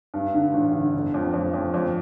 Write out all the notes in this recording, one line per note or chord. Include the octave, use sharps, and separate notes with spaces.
G2
D3
A1
D3
G1
F2
F2
F2
F2